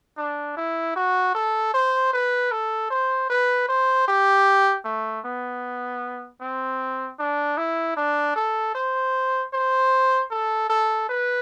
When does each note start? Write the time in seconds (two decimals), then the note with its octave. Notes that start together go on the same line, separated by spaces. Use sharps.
0.17 D4
0.57 E4
0.96 F#4
1.35 A4
1.74 C5
2.13 B4
2.52 A4
2.90 C5
3.30 B4
3.69 C5
4.08 G4
4.85 A3
5.25 B3
6.41 C4
7.19 D4
7.58 E4
7.97 D4
8.36 A4
8.75 C5
9.53 C5
10.31 A4
10.69 A4
11.09 B4